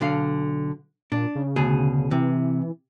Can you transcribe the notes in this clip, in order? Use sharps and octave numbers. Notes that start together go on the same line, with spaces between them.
B1 D3 F5
A#2 D4
C#3
D2 B2 G#4
C3 E3